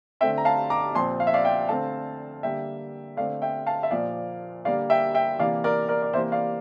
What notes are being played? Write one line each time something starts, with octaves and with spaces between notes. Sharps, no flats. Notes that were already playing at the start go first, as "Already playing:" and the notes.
D3 A3 C4 E5 G5
A#5
F5 A5
A#5 D6
A#2 F3 C4 A5 C6
F5
E5
D5 F5
E5 G5
D3 A3 C4 F5 A5
D3 G3 A#3 E5 G5
D3 A3 C4 D5 F5
E5 G5
F5 A5
E5
A#2 F3 A#3 D5 F5
D3 G3 A#3 D5 F5
E5 G5
E5 G5
C3 E3 A#3 D5 F5
A#4 D5
A#4 D5
D5
C3 E3 A#3 C5 E5
D5 F5